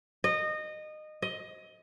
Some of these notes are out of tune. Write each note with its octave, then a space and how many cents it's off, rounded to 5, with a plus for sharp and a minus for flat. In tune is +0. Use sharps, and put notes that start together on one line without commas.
D#5 -20
D#5 +15